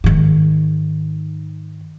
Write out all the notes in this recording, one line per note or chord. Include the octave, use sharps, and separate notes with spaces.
G#2 D#3